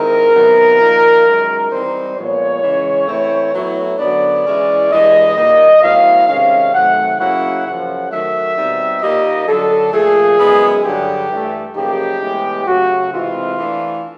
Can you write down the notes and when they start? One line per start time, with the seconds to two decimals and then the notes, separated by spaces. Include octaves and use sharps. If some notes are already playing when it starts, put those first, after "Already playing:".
Already playing: D#3 G#3 C4 E4 A#4
0.34 C3 D#3 F#3 B3
0.80 A#2 F3 A#3 D#4
1.25 F#2 D#3 G#3
1.71 E3 G3 C4 D#4 C5
2.16 A#2 F3 G#3 B3 C#5
2.63 C#3 E3 G#3 C#4
3.07 A2 E3 A3 C4 E4
3.54 A2 F#3 B3 E4
3.99 F#2 D3 F#3 B3 D4 D5
4.45 E3 G#3 C#4 E4
4.90 G2 E3 G#3 D#5
5.36 A#2 G3 A#3 D#4
5.82 A2 F#3 B3 E4 F5
6.27 C3 D#3 G#3 C#4 F5
6.73 C3 D#3 F#3 A3 F#5
7.19 C#3 F#3 A#3 C#4 E4 F#5
7.64 F#2 C#3 F3 F#5
8.10 D#3 F#3 A3 E5
8.56 B2 G3 C4 D#4
9.01 A#2 G3 A#3 D#4 D#5
9.47 F#2 D3 F#3 A4
9.93 A#2 F3 A3 G#4
10.38 F#2 D#3 G#3 B3 E4
10.84 G2 D3 F#3 G4
11.30 G2 E3 A3
11.75 F#2 C#3 F3 A#3 D#4 G4
12.21 A2 E3 G#3 B3
12.67 C#3 F#3 A3 F#4
13.12 C3 E3 G#3 C4 E4 F4
13.58 E3 A3 D4